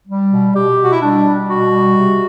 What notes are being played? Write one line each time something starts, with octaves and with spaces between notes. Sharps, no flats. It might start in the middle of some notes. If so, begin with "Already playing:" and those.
G3
B2
B2 G4
B2
F#4
E4
G3 D4
G3
B2 F#4
G3
C3